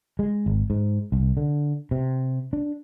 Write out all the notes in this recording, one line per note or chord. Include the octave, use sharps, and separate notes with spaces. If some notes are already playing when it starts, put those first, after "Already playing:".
G#3
G#1
G#2
C2
D3
C3
D4